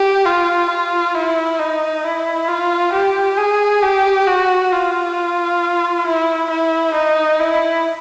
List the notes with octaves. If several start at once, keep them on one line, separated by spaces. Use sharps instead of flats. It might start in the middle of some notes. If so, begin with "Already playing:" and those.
Already playing: G4
F4
F4
E4
D#4
E4
F4
G4
G#4
G4
F#4
F4
E4
E4
D#4
E4